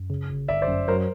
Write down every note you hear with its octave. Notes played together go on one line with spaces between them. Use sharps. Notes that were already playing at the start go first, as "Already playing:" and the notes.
Already playing: F#2
C#3
G1
G1 D5 E5
C5 D5
F#2
F#3 A#4 C5